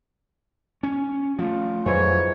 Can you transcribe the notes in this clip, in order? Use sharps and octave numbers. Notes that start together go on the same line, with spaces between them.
C#4
F3 A3 F4
F2 G#2 E3 F#3 C#5